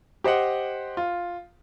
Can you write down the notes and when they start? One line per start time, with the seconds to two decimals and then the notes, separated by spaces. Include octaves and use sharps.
0.24 G4 C5 D#5 F#5
0.97 F4